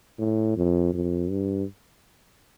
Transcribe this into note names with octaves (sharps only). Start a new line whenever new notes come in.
A2
F2
F2
G2